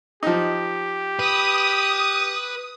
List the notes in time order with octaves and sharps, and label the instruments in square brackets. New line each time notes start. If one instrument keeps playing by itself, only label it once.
[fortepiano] F3 D#4 [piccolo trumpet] G4
[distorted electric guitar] B4 [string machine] D#6